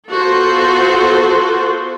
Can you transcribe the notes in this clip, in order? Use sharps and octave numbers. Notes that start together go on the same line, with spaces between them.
B3 F4 F#4 A4 C5